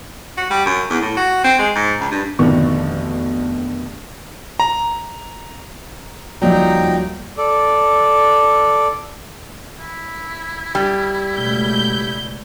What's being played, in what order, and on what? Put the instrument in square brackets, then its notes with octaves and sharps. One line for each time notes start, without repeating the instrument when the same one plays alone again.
[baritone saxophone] F#4
G3
F#2
E2
A2
F#4
C4
G#3
G#2
C#2
G2
[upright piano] F1 B2 D3 D#3 D4 C#6
[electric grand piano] A#5
[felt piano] D#1 F3 D5 [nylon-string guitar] F#3 [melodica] D#4 G5 A#5
[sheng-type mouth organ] A4 D5
[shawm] E4
[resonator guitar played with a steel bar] G3
[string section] C#2 G6 [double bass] B2 A3